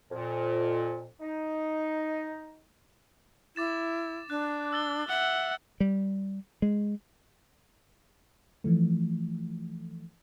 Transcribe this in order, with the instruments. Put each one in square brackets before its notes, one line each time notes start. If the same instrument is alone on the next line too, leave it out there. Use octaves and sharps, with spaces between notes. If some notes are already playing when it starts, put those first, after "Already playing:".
[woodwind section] F2 A#2
D#4
[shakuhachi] E4 [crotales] D6 A6 E7
[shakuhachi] D4 [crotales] F#6
[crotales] E6 A6 G7
[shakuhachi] E5 [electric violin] F#5
[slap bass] G3
G#3
[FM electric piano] E3 F3 A3